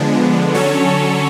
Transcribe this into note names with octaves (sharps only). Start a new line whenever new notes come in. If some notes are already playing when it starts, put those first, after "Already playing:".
Already playing: D3 F3 G#3 B3 D4
D3 F#3 C#4 A4 C#5